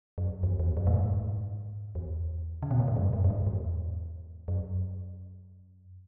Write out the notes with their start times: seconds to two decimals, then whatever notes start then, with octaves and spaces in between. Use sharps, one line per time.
0.18 F#2
0.43 E2
0.60 E2
0.77 F#2
0.87 A2
0.94 G#2
1.95 E2
2.62 C#3
2.71 B2
2.80 A2
2.88 G#2
2.96 F#2
3.13 G#2
3.24 F#2
3.30 G#2
3.47 E2
4.48 F#2